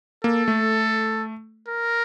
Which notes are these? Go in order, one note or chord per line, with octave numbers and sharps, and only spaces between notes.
A#3 A4
A3
A#4